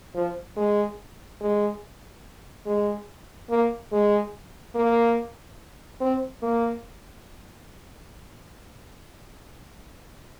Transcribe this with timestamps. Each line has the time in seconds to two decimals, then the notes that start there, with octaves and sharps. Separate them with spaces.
0.15 F3
0.57 G#3
1.41 G#3
2.66 G#3
3.50 A#3
3.92 G#3
4.75 A#3
6.01 C4
6.42 A#3